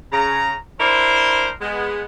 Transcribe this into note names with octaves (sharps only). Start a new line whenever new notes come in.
C#3 A#5
D4 E4 A#4 C5
G#3 B3